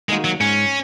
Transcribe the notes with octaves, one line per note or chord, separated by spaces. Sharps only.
D#3 G#3 A#3 D#4 F#4
F#3
G#2 C#4